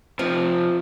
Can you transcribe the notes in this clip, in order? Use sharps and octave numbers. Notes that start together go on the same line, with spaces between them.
F2 C3 F3